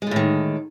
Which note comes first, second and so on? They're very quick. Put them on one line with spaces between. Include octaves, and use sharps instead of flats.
G#3 D3 A2 D#3